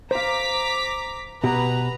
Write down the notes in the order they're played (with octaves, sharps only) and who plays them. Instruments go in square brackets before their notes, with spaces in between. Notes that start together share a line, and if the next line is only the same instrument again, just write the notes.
[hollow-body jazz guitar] C5 F5 [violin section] A#5 D6 B6
[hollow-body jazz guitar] B2 G4 [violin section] B4 A#5